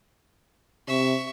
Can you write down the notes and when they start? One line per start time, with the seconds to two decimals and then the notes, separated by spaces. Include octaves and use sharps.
0.88 C3 E5 C#6